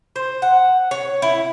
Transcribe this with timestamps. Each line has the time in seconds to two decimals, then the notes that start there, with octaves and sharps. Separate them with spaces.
0.16 C5
0.42 F#5
0.91 C#5
1.22 E4